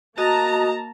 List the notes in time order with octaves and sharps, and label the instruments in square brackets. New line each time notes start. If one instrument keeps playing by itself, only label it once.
[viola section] A#3 A5 A#5 [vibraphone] F#4 D#5 D#6